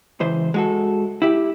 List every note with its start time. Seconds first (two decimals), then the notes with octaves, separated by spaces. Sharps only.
0.20 C#2 E3 C5
0.54 G#3 F#4 A4
1.22 E4 G4